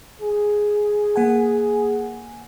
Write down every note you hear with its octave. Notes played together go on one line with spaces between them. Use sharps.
G#4
A#3 F#5 G#5